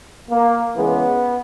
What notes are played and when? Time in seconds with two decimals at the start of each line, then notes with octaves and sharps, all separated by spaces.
0.30 A#3
0.74 C#3 E3 G#3 B3